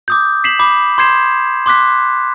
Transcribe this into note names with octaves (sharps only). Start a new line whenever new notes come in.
D6 D#6 G6
B6 C7 E7 F#7
B5 D6
C6 G6 G#6 C7 E7
C6 D6 F#6 B6